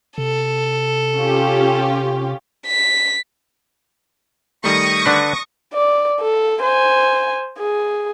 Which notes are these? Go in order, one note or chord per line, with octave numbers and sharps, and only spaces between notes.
C3 A4
C#4 F4 G4
B6
D#3 G3 A3 C#6 D#6 A#6
D3 D4 B4
D5
A4
C5 G#5
G#4